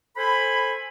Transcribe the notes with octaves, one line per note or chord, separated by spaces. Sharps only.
A4 C5 G#5 B5